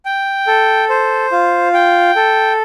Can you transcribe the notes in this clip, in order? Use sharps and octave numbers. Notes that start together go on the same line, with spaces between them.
G5
A4
C5
F4
G5
A4